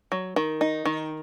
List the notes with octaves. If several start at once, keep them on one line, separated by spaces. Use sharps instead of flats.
F#3
D#3
D#4
D#3